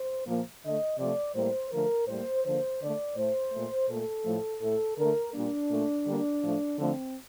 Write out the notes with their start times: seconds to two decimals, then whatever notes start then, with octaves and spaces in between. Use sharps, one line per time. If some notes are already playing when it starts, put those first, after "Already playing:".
Already playing: C5
0.27 A#2 F3 A#3
0.63 D3 A3 D#5
0.99 C3 F3 A3 D5
1.35 A2 G3 A#3 C5
1.71 D3 F3 A3 A#4
2.08 A2 G3 A#3 C5
2.44 D3 F3 A#3 C5
2.81 D3 A3 D5
3.16 A2 A3 C5
3.52 A#2 A3
3.88 A#2 A3 A4
4.25 A2 F3 A3
4.62 A2 A3 A4
4.98 D3 A3 A#4
5.33 A#2 G3 A#3 D4
5.69 A#2 A3
6.06 D3 G3 A#3
6.42 A2 F3 A3
6.78 D3 F3 A3 C4